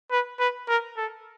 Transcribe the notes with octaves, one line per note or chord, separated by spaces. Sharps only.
B4
B4
A#4
A4